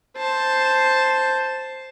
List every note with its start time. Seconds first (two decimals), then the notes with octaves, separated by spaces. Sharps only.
0.16 C5 A5